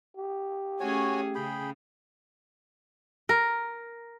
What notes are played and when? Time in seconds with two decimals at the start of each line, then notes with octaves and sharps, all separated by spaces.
0.17 G4
0.80 A3 C#4 F#4 G#4 C#5 G#5
1.35 C#3 G#4 G5 B5
3.29 A#4